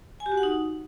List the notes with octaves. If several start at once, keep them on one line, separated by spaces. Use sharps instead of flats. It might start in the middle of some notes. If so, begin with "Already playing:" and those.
G#5
G4
F#4
F#5
D#4